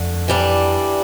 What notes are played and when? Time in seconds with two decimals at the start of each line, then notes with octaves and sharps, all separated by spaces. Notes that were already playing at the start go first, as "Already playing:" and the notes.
Already playing: F2 D3 A3
0.28 E3 G3 D4